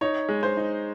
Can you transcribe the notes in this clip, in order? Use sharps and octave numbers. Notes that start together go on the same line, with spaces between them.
D#4 C#5
G#3
C5
D#4